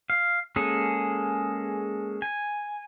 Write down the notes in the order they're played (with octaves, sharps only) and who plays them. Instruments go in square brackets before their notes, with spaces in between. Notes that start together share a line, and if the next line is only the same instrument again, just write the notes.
[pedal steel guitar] F5
G#3 A#3 C#4 G#4 A4
G#5